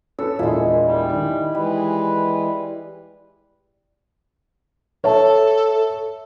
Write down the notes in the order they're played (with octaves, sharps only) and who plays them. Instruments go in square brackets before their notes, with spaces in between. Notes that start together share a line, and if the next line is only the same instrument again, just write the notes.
[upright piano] C#4 A4 B4 [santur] E6
[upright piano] E1 A#2 F4 [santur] G#3 E4
[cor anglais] G3
[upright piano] D#3
[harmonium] E3 G#3 [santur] G3 [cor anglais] B4
[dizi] A4 [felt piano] C#5 E5 A5